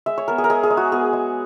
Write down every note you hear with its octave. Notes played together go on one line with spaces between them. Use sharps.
G#3 E5
C#5
B3 A#4
G#4
A#4
G#3 G#4
G#4
G#3
F#4
B3 G#4
G#3